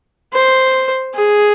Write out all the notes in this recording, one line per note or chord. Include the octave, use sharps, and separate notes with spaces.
C5
G#4